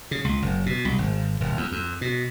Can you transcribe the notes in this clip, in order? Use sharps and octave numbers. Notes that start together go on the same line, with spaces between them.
C#3
C#2
F#1
B2
C2
G#1
D#1
E2
F2
B2